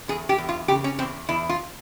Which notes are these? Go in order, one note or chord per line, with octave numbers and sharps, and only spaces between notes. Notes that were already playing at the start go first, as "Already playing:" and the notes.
E2 G#4
G4
E2
F4
C#3 G4
C#4
E2 C4
E2 E4
F4